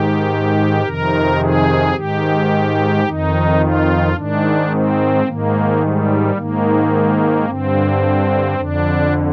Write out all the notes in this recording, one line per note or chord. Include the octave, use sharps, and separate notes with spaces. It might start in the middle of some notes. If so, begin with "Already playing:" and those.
Already playing: G#2 D#3 G4
F2 C3 D#3 A#4
G#4
G#2 D#3 G4
F2 D#3 D#4
F4
G#2 D#3 D4
C4
G#2 D#3 A#3
G3
G#2 D#3 A#3
G2 D3 C4
F2 D3 D4